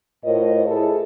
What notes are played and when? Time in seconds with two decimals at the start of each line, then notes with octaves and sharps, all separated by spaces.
0.24 A2 F4 A#4 C5 C#5 D#5
0.66 E4 G#4 A4